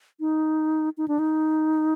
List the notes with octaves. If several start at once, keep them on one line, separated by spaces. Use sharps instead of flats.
D#4
D#4
D4
D#4